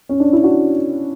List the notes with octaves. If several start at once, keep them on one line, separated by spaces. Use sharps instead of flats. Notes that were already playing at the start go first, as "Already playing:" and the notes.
C#4
D4
E4
D4 F#4